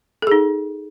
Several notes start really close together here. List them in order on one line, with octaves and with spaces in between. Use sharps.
A4 G#4 D#4